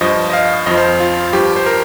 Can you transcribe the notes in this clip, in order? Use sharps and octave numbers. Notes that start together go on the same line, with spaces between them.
G2 F3 D#5
D#5
F5
F2 F3 D#5
C5
F4
G2 F3 G4
C5
A#4